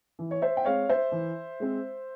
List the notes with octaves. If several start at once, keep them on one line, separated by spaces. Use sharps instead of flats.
E3
C#5
C5 E5
G5
G#3 C4 C#5 F5
C5 E5
E3
G#3 C4